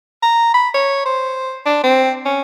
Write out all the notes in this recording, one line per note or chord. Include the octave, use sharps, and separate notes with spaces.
A#5
B5
C#5
C5
D4
C4
C#4